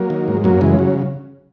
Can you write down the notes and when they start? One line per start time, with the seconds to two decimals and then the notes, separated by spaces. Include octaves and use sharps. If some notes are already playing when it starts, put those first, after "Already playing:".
Already playing: F#3 A#3
0.10 D#3
0.28 G#2
0.44 F#2 F#3 A#3
0.61 C#3 E3 G#3
0.79 F#3